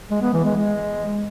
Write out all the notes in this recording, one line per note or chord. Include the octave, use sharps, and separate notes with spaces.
G#3
B3
E3
G#3
G#3